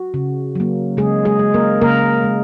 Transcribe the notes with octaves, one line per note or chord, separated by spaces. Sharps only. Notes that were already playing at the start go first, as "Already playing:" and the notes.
Already playing: F#4
C#3
F#3 A#3
C#3 G#3 G#4
G#3 G#4
G#3
A#3 A#4
C#3 A#3 A#4
G#3